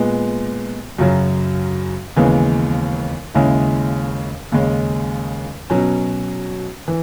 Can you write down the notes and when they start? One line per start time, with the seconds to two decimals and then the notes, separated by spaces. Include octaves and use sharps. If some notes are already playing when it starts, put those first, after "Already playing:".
Already playing: A#2 G#3 B3
0.98 F#2 C#3 F#3
2.16 D#2 C#3 E3 G#3 B3
3.34 D#2 C#3 G#3 C#4 E4
4.52 D#2 C#3 G#3 C#4
5.70 B2 F#3 C#4
6.88 E3